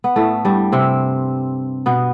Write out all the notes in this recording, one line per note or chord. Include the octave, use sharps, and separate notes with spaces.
B3
A2 A3
G2 G3
C3 C4
B2 B3